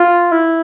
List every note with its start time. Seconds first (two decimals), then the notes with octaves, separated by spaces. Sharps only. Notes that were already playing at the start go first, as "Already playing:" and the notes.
Already playing: F4
0.32 E4